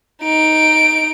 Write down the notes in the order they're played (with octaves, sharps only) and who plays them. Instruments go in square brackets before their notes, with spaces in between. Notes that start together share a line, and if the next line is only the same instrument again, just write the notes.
[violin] D#4 D7